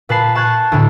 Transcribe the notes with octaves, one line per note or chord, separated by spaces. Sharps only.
A#2 B4 A5 C7
A5 C#6 F#6 G#6 A6
D2 A2